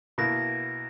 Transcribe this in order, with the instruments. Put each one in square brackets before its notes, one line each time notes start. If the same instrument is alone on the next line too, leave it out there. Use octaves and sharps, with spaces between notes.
[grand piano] B2 A#3 E4 [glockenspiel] A#6